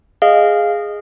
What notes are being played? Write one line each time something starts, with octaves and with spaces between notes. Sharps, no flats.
G#4 D#5 F5